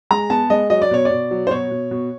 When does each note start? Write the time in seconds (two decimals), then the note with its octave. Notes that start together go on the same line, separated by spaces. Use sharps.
0.11 G#3 A#5
0.30 B3 A5
0.50 G#3 D#5
0.70 F#3 D#5
0.82 D5
0.91 B2 C#5
1.05 D5
1.10 B2
1.31 F#3
1.47 C5
1.51 B2 C#5
1.71 B2
1.91 B2